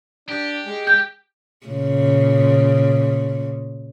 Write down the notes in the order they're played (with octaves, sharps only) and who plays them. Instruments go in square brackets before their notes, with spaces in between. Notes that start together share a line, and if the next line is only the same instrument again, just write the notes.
[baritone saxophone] D4 [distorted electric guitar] G4
[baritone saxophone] G#3
[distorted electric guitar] G4 [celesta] G6
[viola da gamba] A#2 C#3